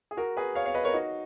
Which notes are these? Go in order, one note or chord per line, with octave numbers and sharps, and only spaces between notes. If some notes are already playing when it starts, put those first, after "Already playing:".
G#4
F#4 A#4
G#4 B4
C#5 F5
C#5 F5
B4 D#5
A#4 C#5
D#4 F#4